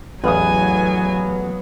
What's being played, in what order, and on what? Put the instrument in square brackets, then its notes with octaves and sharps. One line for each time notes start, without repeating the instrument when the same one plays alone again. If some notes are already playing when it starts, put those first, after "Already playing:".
[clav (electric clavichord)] A1 E2 [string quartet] F#3 [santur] B3 F5 D#6 [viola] G#5